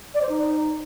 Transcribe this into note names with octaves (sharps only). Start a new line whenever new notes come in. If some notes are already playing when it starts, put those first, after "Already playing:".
D5
C5
D#4